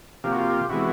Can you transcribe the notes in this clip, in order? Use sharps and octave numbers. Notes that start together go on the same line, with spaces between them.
C3 F3 A#3 G4
F#4
F4 G4
C3 E3 G#3 B3 E4 F#4